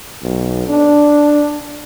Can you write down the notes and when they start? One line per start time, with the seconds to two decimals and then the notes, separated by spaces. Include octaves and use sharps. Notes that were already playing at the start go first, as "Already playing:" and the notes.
0.22 B1
0.68 D4